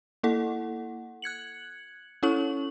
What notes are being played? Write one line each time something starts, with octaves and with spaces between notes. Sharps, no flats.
A#3 E4 A4 F#5
F#6 G#6 C#7 F#7
C#4 E4 A4 C#5 C#6 F#7